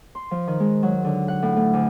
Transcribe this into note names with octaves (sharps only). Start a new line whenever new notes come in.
C6
F3
D#3
G#3
F#3
D3
F#5
A2
A3
D2